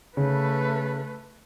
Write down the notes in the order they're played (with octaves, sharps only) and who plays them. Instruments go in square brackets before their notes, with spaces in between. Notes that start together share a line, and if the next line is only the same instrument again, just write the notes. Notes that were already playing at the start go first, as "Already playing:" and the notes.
[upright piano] C#3 [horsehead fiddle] A3 B4